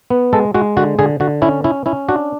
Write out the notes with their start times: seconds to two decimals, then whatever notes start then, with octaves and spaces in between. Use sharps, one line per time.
0.10 B3
0.33 G#3 A4
0.54 G#3 F#4
0.77 D3 F#4
0.99 D3 G#4
1.20 D3 F#4
1.42 C#4 E4
1.64 C#4 E4
1.86 C#4 E4
2.08 D4 F#4